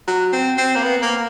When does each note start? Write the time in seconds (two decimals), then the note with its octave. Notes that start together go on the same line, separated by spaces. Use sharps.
0.07 F#3
0.33 C4
0.58 C4
0.75 A#3
0.83 B3
1.02 A#3